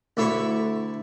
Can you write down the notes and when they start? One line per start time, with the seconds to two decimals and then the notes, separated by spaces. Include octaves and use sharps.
0.17 D2 A3 E4 C#5 B5 C#6